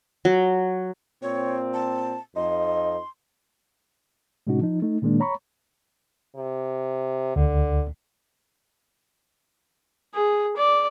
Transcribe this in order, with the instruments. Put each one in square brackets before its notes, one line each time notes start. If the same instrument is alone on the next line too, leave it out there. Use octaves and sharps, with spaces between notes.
[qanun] F#3
[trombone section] A#2 C4 [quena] C#5
[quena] A5
[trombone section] F2 [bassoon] D#4 [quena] C6
[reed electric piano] A2 C3 G#3 C#4 D#4 F#4
F3 D#4
A3 D#4
A#2 D#3 G#3 A#3 D4
C#5 A#5 B5 C#6
[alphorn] C3
[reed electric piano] D2 [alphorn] D3
[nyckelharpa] G#4
D5